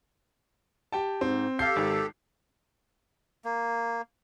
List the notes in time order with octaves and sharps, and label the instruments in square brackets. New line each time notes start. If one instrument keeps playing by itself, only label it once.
[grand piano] G4 G5 A5
[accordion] G#2 [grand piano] C4
[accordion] G4 A4 [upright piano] F5 C7 [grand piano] G6
[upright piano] G#1
[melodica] A#3